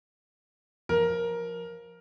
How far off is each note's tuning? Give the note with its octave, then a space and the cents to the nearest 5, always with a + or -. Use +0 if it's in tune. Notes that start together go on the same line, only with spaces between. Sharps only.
F3 +5 A#4 +10